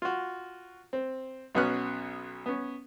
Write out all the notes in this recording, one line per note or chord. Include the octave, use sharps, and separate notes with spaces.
F4 F#4
C4
B1 B2 B3 C#4 F6 F#6
B3 C#4